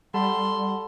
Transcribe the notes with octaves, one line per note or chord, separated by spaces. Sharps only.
G3 A4 F#5 A5 B5 C6